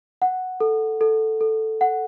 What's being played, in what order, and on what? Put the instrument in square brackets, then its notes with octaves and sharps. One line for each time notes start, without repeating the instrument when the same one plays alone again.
[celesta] F#5
A4
A4
A4
F#5